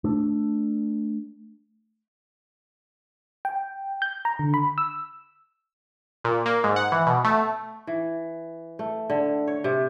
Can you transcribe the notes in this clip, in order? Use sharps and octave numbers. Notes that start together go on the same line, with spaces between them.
A3 D4
G5
G6
A#5
D3
B5
E6
A#2
A#3
G#2
F#5
E3
B2
A3
E3
A3
D3
C#5
C3